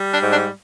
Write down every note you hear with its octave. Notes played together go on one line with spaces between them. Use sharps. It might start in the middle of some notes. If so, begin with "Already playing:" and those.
Already playing: G3
D4
G#2
D4